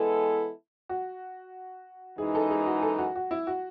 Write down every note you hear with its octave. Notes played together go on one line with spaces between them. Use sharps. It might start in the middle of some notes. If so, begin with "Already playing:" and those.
Already playing: E3 G#3 B3 E4 A4
F#4
F#2 E3 G#3 D#4 G#4
A4
G#4
F#4
A4
F#4
F#4
E4
F#4